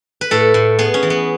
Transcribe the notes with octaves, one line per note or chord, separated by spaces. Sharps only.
B4
A2 A4
A2
B3 G#4
C#4
E3
B3